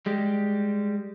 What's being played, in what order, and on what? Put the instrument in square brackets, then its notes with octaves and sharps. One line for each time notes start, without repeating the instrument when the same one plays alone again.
[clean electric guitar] G3 G#3 G4